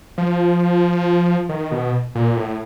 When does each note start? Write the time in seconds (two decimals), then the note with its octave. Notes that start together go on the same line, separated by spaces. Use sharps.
0.18 F3
1.49 D#3
1.72 B2
2.15 A#2
2.37 A2